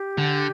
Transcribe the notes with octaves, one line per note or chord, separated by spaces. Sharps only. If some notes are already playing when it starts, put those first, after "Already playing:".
Already playing: G4
D3